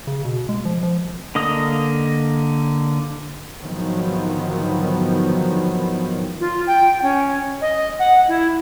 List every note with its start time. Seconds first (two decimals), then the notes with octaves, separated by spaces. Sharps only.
0.07 C#3
0.25 B2
0.49 G#3
0.65 F3
0.83 F3
1.05 G#1
1.35 D3 A#3 D#5 D#6
3.61 G#2 D3 D#3 F3 F#3 B3
6.40 F4
6.67 G5
7.02 C#4
7.61 D#5
7.99 F#5
8.28 E4